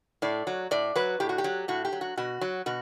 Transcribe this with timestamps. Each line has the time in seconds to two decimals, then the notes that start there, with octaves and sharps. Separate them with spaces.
0.22 A2 D5
0.47 F#3
0.71 A2 D5
0.95 F#3 B4
1.20 A2 G4
1.29 F#4
1.38 G4
1.44 F#3
1.68 A2 F#4
1.85 G4
1.92 F#3
2.01 F#4
2.17 B2 F#4
2.41 F#3
2.66 B2 F#4